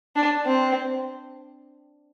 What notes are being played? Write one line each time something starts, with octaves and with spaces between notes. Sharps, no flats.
D4
C4